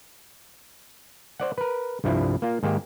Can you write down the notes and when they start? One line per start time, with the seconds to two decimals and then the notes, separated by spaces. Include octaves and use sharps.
1.40 C5 D5 F#5
1.58 A#4 B4
2.04 C2 G2 F3 E4 D5
2.42 A#3 F4
2.63 G#2 D#3 A#3 G4